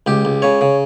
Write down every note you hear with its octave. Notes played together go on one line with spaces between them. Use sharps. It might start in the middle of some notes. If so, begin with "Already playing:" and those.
C#2 G4
C#2
C#3 C#5
C#3